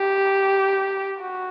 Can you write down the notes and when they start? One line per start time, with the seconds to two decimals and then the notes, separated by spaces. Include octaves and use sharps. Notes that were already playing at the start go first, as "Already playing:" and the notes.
Already playing: G4
1.20 F#4